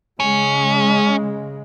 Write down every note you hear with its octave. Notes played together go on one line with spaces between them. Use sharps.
C#3 G#3 C#4